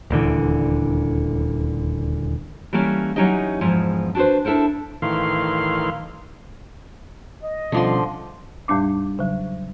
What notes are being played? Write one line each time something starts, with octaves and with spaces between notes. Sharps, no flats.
D#1 D2 D3 E3
E3 G3 A3 A#3 C#4
F#3 C#4 D#4 E4 G4 D#5
E2 G#2 F3
D4 F#4 G#4 B4 C5
D4 E4 A4 A#4 C5
A2 D#3 E3 F5 C6
D#5
B2 D3 F3 G3 C#4 C6
E2 A2 G3 D4 D6
C#3 F#3